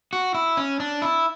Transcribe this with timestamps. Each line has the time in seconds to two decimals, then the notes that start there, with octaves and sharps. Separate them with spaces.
0.13 F#4
0.34 E4
0.57 C#4
0.80 D4
1.02 E4